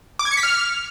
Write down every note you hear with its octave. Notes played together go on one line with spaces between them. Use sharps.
D6
G#6
C#7
B6
F6